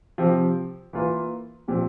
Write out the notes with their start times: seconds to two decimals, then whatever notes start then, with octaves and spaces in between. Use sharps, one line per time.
0.18 C3 F3 C4 G4
0.93 E3 A#3 F4
1.68 A#2 F3 C4 G4